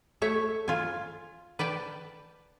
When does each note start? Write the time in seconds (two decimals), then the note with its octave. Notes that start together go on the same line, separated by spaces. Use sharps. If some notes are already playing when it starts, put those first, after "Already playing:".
0.22 A3 C#5 E5
0.68 F4 G#5
1.59 B4 D5 G5 A5